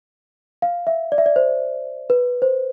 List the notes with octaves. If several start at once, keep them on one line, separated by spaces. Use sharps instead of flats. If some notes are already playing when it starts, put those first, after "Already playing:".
F5
E5
D5
E5
D5
C5
B4
C5